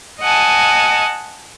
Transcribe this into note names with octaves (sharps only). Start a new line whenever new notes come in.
D#5 F#5 G#5 A5